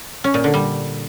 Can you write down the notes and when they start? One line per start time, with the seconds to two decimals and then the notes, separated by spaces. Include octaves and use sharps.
0.24 C#4
0.34 A#2
0.44 D3
0.54 G3